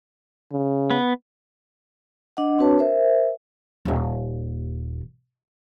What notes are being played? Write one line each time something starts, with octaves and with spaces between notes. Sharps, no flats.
C#3
B3
D4 D#5 F#5
C4 D4 F#4 B4 C#5 A5
A#4 C5 E5
D#1 D#2